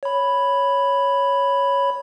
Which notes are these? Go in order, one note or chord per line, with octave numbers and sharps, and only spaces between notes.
C#5 B5